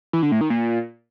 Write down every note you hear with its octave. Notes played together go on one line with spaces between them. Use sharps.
E3
D3
A2
D#3
A#2